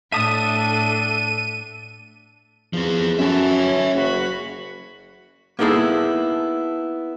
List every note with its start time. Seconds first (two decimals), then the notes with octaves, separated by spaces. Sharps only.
0.12 A2 D4 A4 E5 A5 D#6 D#7
2.73 E2 F3 C4
3.19 F#2 A4 E5 G#5
3.56 C#4
3.94 F#1 F#4 B5
5.59 A#3 B3 D#4 E4 G#4 A4